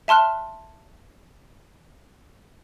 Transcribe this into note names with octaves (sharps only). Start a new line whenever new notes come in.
E5 A5 C6 F6 F#6